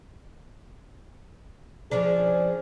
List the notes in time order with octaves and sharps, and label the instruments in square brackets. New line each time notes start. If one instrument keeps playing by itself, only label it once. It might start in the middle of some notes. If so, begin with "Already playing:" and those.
[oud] F3 C#4 D4 [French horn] G#4